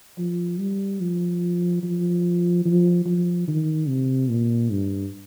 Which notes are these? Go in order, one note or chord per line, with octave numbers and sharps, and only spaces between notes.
F3
G3
F3
F3
F3
F3
D#3
C3
A#2
G2